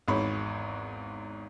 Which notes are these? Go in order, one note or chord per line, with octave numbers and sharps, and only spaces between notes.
G#1 E2 G#2 C#5 B5